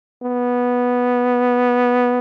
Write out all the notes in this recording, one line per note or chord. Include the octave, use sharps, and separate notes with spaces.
B3